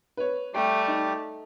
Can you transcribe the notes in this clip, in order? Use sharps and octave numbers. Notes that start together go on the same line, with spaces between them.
B4 C#5
G3 A3 G4 G5
D#4